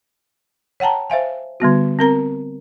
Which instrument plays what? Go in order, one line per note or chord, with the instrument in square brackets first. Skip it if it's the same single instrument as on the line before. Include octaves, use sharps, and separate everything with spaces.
[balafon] C#5 F#5 G5 A5 A#5
C5 E5 F5 G#5
D3 G3 B3 F#4
C4 A#4 A#5